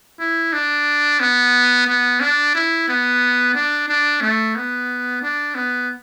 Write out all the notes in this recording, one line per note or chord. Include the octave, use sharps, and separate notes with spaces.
E4
D4
B3
B3
D4
E4
B3
D4
D4
A3
B3
D4
B3